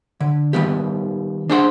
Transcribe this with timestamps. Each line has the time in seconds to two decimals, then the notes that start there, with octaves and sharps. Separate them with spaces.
0.20 D3
0.53 D#3 G3 B3 G4
1.49 D4 G#4 C5 F#5 A5 C6